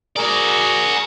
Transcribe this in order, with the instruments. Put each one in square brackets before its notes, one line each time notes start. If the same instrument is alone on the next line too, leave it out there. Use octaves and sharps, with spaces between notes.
[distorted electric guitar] F#4 D5 [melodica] G#4 A#4